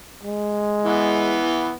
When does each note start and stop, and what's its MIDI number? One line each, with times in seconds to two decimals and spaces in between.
0.23 1.44 56
0.85 1.75 52
0.85 1.75 59